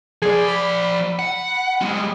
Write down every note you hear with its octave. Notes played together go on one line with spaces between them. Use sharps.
F3 G#4 D5
B5
F#5
G3 G#3